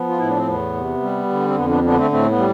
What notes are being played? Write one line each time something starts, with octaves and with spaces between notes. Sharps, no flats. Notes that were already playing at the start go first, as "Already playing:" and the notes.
Already playing: F3 B3
F4
A2 E4
D4
C4
E2 B3
C3
G3
D3
C4
F2 B3
B3 D4
D3 B3 D4
A3 C4
A2 A3 C4
B3
G3